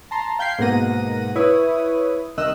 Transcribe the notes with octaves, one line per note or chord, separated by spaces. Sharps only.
A5 A#5 C6
F5 G5 G6 G#6 B6 C7
G#2 B2 A#3 F#5 A#6 D#7
E4 B4 C#5 D#6
C2 D#3 D#5 E6 F#6